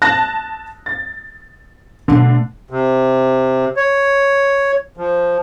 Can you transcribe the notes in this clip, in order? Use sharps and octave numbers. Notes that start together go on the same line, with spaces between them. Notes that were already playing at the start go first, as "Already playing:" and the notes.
A5 F#6 A#6
A6
B2 D3 A3
C3
C#5
F3